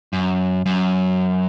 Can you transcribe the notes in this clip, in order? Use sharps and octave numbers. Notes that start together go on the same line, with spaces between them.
F#2
F#2